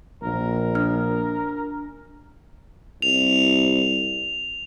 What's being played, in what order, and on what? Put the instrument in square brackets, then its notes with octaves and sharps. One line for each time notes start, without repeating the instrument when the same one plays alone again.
[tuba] A#1 [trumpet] A#4
[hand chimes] D4 F6
[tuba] C2 [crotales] F7